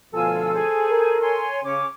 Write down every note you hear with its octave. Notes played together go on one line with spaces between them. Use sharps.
D2 B2 F3 F4 A4 G#5 E6
G#4 C5 G#5
A#4
C#5 G#5 C6
C#3 C#4 D6